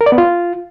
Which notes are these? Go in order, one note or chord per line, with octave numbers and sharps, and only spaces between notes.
A#4
D5
B3
F4